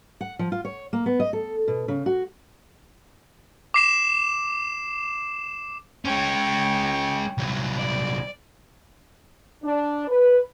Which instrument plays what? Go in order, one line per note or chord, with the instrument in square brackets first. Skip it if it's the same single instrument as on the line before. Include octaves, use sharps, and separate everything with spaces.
[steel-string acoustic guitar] F#5
F3
F4
C#5
A#3
B3
D#5
A4
B2
C#3
F#4
[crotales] D6 C7 E7
[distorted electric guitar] G#3 C#4 [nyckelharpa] C#5 G5
[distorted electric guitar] C2 F#3
[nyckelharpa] D5
[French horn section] D4
B4